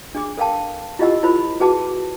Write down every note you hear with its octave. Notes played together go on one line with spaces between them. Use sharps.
D4 G#4 D6
A4 A#4 F5 G5 A5
E4 F4 G4 D#5 F#5 E6
E4 F4 A#4 C5 B5
F#4 G#4 B4 F#5 A5 D6